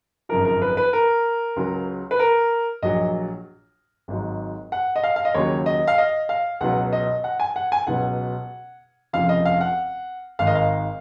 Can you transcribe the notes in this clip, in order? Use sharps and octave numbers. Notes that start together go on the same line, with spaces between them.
G#1 F#2 C#3 F3 A#4
A#4
B4
B4
A#4
C#2 C#3 F#3
B4
A#4
A#1 A#2 F#3 D#5
G#1 G#2 F#3
F#5
D#5
F5
F5
D#5
D#2 C#3 F#3 C#5
D#5
F5
D#5
F5
C#2 B2 F#3 F#5
D#5
F#5
G#5
F#5
G#5
C#2 B2 F#3 F#5
F1 F2 C#3 F3 F5
D#5
F5
F#5
G#1 G#2 D#3 F5
D#5
F5